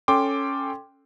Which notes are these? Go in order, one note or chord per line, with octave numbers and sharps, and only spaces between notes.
C#4 A4 G5 C6 D6